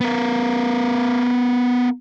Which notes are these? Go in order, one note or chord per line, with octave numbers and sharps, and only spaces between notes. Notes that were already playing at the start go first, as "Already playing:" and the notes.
B3 A#4